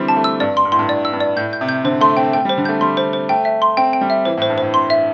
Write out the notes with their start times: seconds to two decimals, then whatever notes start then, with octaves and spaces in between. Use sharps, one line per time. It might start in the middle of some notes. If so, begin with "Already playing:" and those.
Already playing: D3 E3 G3 C4
0.08 A5
0.16 A3
0.24 E6
0.40 G2 D5
0.57 C6
0.65 G2
0.72 A2 C6
0.79 G2
0.88 A2 D5
1.05 E6
1.13 G2
1.20 D5
1.36 A2 G6
1.53 G6
1.61 C3
1.69 G6
1.84 D3 C5
2.01 A3 C6
2.17 C4 G5
2.33 A3 G5
2.45 G3
2.49 C5
2.57 D3
2.65 A3 G6
2.81 G3 C6
2.97 C5
3.13 C5
3.29 A3 G5
3.45 E5
3.62 C6
3.77 C4 G5
3.93 G5
4.01 G3
4.10 E5
4.25 E3 C5
4.37 A2
4.42 C5
4.50 G2
4.58 A2 C5
4.74 C6
4.90 E5